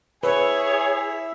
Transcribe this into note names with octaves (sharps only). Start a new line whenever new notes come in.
E4 G#4 B4 C#5 E5